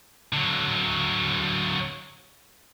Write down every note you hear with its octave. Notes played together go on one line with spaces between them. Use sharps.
D3 F#3